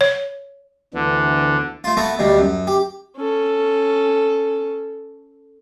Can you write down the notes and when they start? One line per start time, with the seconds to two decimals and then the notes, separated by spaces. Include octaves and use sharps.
0.01 C#5
0.94 D2 D3 E3 B3
1.84 A3 F4
1.97 A3 B3 F#4 A4
2.19 D2 B2 G3
2.39 F#2
2.67 G4
3.17 C#4 A4